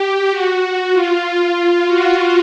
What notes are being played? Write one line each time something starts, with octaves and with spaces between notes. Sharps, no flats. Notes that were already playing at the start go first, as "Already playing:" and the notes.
Already playing: G4
F#4
F4
F4
F#4